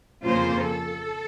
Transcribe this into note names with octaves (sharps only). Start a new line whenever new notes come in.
F2 C#3 F3 A#3 F4 C5
A4